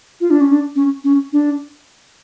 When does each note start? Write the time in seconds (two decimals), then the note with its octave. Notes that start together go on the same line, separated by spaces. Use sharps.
0.21 F4
0.30 D4
0.41 C#4
0.51 D4
0.76 C#4
1.04 C#4
1.33 D4